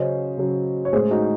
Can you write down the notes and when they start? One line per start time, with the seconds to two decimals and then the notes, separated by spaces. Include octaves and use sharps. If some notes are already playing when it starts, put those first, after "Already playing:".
Already playing: C#3 F#3 C#4 C5 D#5
0.38 C#3 F#3 C#4
0.85 C#5
0.93 A2 G#3 C#4 G#4 C5
1.11 D#4 F#4